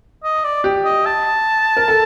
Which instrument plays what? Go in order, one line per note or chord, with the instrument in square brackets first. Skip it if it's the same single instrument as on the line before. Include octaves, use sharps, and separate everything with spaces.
[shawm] D#5
D5
[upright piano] G4
[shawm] D#5
A5
[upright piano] A#4
A4